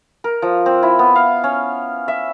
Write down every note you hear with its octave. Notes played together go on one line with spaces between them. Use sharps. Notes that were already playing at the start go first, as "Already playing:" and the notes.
A#4
F3
C4
E4
B3
F5
C#4
E5